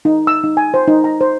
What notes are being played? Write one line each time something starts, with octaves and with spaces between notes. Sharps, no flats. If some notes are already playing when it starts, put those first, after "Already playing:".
D#4
E6
D#4
G#5
C5
D#4
A#5
C5